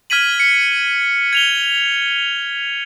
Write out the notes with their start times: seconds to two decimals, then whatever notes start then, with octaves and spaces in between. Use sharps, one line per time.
0.10 F6 G#6 B6 D#7 F#7
0.40 C#7
1.33 G#6 F7 G7